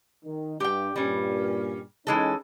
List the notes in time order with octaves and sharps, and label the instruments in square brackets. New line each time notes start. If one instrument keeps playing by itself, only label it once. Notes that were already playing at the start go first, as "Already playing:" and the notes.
[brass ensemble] D#3
[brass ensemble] G2 [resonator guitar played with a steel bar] G4 G5
[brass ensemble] G2 A#2 [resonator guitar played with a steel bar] G3 C#4
[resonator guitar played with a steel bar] E3 G#3 A4 [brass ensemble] C#4 D#4